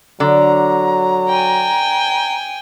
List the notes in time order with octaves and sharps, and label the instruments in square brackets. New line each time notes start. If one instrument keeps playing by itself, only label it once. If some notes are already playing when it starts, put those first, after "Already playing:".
[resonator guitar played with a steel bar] D3 [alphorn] F#3 [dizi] A#5
[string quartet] G5 G#5